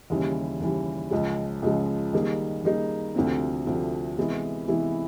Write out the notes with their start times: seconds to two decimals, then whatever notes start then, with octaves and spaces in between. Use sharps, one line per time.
0.10 D#2 C#3 E3 G3
0.60 D#2 C#3 E3 G3
1.11 C#2 C#3 F3 G#3
1.62 C#2 C#3 F3 G#3
2.13 D#3 G3 A#3 D#4 G#4
2.64 D#3 G3 A#3 D#4 G#4
3.15 D2 C3 F3 A3 C4
3.67 D2 C3 F3 A3 C4
4.17 C3 E3 G#3 B3 E4
4.68 C3 E3 G#3 B3 E4